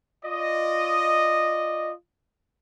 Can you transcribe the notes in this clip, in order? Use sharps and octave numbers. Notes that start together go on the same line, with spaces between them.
F4 D5 D#5